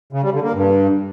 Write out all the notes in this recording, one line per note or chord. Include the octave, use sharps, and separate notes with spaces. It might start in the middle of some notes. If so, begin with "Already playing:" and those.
C#3
G3
D3
A#3
G2